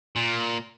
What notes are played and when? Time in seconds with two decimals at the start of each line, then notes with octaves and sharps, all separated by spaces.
0.16 A#2